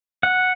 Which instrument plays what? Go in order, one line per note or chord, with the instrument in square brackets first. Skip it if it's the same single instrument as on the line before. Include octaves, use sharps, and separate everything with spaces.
[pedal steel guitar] F#5